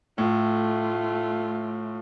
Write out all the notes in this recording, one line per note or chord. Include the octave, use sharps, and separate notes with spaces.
A2 A3 F4